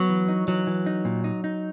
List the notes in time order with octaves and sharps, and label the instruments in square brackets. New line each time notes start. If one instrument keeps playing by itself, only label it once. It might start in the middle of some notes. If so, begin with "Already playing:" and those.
Already playing: [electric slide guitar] F#3 [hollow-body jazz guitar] B3
[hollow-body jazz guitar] E3
D#4
[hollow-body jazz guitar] E3 [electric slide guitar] F#3
[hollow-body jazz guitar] E3
D#4
A#2
D#4
D#4